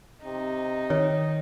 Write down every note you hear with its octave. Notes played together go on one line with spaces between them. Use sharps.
C3 D#4
D#3 C#5